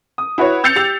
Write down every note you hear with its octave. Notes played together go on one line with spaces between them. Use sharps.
D#6
E4 F#4 B4 C#5
E6 G6 A6 C7 C#7 F7
G4 A6 F7